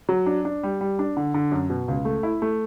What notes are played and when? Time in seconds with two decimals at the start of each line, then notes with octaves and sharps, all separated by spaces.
0.09 F#3
0.26 D4
0.45 D4
0.63 G3
0.81 G3
0.99 D4
1.17 D3
1.34 D3
1.51 F#2
1.69 B2
1.88 C#2
2.05 A3
2.23 E4
2.42 A3